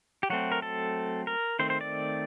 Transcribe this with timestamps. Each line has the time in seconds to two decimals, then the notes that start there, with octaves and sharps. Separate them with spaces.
0.23 G4
0.30 F#3 A3 C4 F#4
0.52 A#4
0.62 A4
1.27 A#4
1.59 D#3 A3 C4 C5
1.70 C5
1.81 D5